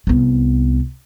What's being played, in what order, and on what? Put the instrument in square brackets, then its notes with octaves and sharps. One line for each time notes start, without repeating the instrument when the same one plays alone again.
[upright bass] C2 B3